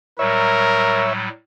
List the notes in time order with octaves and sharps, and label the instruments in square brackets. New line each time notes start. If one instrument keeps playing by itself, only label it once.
[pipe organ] A2 F#3 G3 [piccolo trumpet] A#4 [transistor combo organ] C#5 E5